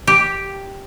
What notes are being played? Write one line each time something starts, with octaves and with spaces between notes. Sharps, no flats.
G4